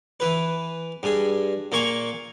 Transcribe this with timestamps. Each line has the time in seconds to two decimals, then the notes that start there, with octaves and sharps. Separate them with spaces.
0.20 E3 B4
1.03 G2 G#4
1.72 A#2 A#3 G#5 C#6